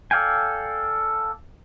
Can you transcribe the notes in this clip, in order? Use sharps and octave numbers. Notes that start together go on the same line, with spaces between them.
A4 D5 F5 G5 G#5